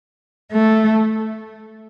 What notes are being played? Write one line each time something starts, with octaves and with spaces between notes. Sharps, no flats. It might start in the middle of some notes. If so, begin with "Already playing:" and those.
A3